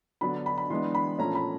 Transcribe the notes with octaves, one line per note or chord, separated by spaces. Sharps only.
D3 F#3 B3 D4 B5
B5
B5
E3 G#3 B3 D4 C6
B5
A#2 F3 A3 C#4 A#5
B5